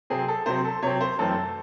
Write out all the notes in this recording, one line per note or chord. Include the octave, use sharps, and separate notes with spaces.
C3 F#3 C4 G#4
A4
C3 F#3 C4 C5
A4
C3 F#3 C4 C#5
C5
F#2 E3 A3 C4 A4